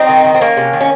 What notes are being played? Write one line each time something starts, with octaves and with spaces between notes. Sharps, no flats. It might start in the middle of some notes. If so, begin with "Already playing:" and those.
Already playing: G3 C4 D#4
D#3
D#3
C4
D#3 A#3 C#4
C3
D#3
C#4